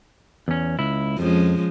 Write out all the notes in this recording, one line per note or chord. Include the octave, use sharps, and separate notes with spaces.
E2 C#4
C#2 E4
F2 F3 G#3 C#4